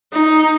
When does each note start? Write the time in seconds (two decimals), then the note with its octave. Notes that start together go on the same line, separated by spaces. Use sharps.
0.13 D#4